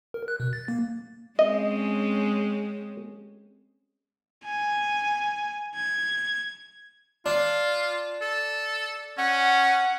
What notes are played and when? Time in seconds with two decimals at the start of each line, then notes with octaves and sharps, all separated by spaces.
0.14 A#4
0.28 F#6
0.40 B2
0.53 A6
0.68 A#3
1.39 G#3 C4 C#4 D#5
4.45 G#5
5.75 G#6
7.26 D4 F4
8.21 A4
9.18 C#4 F#5